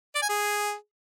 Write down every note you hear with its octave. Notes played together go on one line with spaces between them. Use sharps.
D5
G#5
G#4